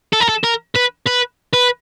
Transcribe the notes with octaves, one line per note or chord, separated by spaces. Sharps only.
A4
A#4
A4
A#4
B4
B4
B4